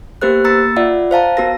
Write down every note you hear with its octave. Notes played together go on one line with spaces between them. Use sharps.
A#3 B3 G4 A#4 C5 F#6
A#3 A#5 E6 A6 C#7
F4 D5 E5 F#5
C5 F5 A5 A#5
B3 F#4 A#4 A#6